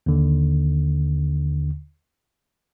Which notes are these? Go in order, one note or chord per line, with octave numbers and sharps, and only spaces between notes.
D#2 D3